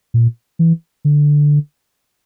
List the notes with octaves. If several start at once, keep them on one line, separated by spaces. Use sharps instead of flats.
A#2
E3
D3